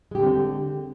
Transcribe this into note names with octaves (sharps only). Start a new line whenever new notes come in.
D3 G#3 C4 G4